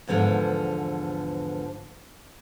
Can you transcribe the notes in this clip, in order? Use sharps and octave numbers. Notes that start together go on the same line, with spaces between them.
E2 G#2 D3 F3 B3